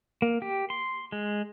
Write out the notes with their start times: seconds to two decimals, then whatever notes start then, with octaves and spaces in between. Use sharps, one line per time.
0.22 A#3
0.42 G4
0.70 C6
1.12 G#3